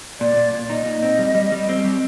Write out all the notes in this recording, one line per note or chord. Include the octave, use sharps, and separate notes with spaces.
A#2 D5
A#2
A#2
D#4 D#5
A#2
C4
G3
G3
G3
C4
G3